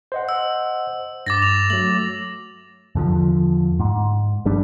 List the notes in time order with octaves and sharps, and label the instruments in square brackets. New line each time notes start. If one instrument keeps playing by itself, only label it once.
[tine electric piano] C5 D#5 F#5
[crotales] E6
[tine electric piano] G2 [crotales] D6 A6 A#6
[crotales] F7
[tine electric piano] F#3 A3 [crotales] F#7
[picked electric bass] E2 D3 F3
G#2
G#1 G2 G3 D4